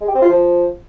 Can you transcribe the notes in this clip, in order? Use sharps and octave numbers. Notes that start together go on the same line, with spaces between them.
G#3
G4
C4
F4
F3